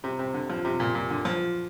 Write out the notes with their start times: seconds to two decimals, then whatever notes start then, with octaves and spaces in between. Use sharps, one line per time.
0.04 C3
0.19 C3
0.34 D3
0.50 F3
0.65 C3
0.80 A#2
0.95 A#2
1.10 D3
1.25 F3